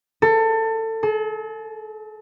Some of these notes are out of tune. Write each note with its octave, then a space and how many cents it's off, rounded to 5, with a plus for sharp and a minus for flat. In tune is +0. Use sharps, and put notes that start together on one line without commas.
A4 +25
A4 -45